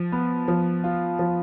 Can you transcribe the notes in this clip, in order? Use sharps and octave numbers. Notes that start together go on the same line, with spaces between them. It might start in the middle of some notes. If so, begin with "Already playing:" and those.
Already playing: F3
B3
F3
F4
F3